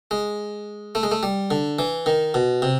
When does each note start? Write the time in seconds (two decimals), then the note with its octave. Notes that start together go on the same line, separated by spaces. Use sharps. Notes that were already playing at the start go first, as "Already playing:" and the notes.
0.11 G#3
0.95 A3
1.03 G#3
1.11 A3
1.23 G3
1.51 D3
1.79 E3
2.06 D#3
2.34 B2
2.62 C3